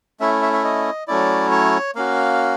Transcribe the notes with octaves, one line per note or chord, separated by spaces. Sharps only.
A3 C#4 E4 E5
E5
E5
D#5
F#3 A3 C#4 E4 D5
C#5
A#3 C#4 F#4 F5